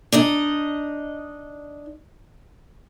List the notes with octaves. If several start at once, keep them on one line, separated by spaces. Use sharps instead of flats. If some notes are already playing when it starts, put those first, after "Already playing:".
D4 D#4 D#5